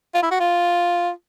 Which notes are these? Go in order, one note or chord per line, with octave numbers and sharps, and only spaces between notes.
F4
E4
F#4
F4